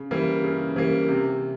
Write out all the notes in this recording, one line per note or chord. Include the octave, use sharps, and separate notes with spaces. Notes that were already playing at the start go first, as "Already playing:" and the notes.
Already playing: C#3
E3 G3 A#3
C#3
E3 G3 A#3
C3